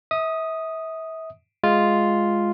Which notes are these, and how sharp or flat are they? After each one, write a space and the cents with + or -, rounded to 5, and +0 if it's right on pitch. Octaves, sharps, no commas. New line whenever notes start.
E5 -35 D#6 +0
G#3 +0 F4 +0